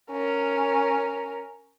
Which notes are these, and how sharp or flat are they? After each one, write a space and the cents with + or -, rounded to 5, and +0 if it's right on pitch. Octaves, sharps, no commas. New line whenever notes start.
C#4 +0 A#4 -5